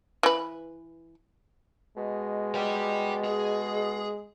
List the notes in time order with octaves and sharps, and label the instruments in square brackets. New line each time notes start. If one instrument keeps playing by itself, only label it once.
[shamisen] E3 B4
[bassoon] B2 [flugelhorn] G#3
[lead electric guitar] D5 G5
G#4